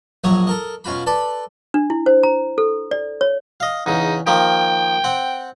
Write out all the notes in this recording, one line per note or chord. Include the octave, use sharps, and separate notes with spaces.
A#1 F#2 F#3 C#5 E5 D#6
A4 A#4 D#5
B2 C#4 F4 F#4 B5
A4 B4 D5 A5 B5
D4
E4
C5
A#5
A4
D5
C#5
D#5 F5
E2 C#3 D#4
D#3 F3 A#3 G5
C4 F#5